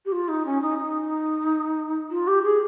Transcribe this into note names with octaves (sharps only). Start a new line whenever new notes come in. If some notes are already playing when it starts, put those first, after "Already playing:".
G4
F4
D#4
C#4
D#4
D#4
F4
G4
G#4